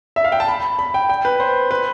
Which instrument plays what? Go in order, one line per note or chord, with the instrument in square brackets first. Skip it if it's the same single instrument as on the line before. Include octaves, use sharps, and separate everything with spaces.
[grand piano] E5
F5
G5
A5
B5
B5
G5
G5
B4
C5
B4